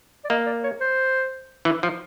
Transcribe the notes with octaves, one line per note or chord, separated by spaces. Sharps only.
D5
A#3 D#5
D5
C#5
C5
E3
F3